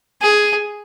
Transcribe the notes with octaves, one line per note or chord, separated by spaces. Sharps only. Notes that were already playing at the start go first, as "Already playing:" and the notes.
G#4